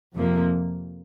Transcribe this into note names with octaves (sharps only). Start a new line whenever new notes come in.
F2 C3 F3 A#3